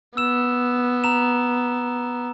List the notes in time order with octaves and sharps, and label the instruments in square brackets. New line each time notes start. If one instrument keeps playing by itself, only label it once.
[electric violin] B3 [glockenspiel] E6 E7
[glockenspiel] A#5 E7